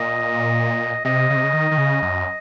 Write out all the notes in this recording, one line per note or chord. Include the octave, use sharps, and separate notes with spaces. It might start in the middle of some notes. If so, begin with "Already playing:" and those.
Already playing: A#2 D#5
C3 D#5
C#3
C3
C#3
D#3
D#3
C#3
F#2